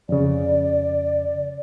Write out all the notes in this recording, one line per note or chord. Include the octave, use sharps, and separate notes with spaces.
F2 C#3 D5